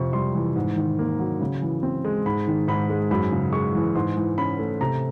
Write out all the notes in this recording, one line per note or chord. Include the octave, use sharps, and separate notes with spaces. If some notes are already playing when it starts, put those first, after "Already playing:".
Already playing: F2 C3 C#6
G3 C6
E3
G#2
D#3
A#3
F#3
C#3
E3
C4
G#3
G#2 B5
D#3
G#2 B5
G#3
F#2 B5
C#3
G#3 C#6
E3
G#2 C6
E3
C#4 B5
A3
C3 A#5